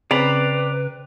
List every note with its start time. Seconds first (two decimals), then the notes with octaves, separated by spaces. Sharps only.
0.11 C#3 C4 B4 D5 A#5 B5